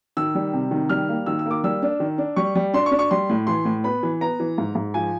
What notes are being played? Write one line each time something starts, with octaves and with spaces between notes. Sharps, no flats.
D#3 E6
G3
C3
D#3
G3 F6
A#3
D#3 E6
E6
A#3 D6
G3 E6
D4
D#3
D4
G3 C#6
G3
D4 C6
C#6
D4
C#6
G3 C6
A2
E3 C6
A2
B3 B5
E3
B3 A#5
E3
G#2
G#2
F3 G#5